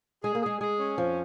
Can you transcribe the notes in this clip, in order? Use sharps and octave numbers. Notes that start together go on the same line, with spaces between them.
G#3 G#4
A#3
G#3 G#4
G#3 G#4
C#4
F2 F3